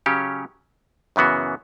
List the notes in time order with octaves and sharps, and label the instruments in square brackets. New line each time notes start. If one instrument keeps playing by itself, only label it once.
[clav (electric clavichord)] C#3 F#3 C#4 G4 C#5
F#2 C#3 E3 B3 F#4